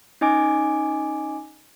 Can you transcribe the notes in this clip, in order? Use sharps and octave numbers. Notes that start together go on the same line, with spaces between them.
C#4 D#4 D#5 G#5 D6 D7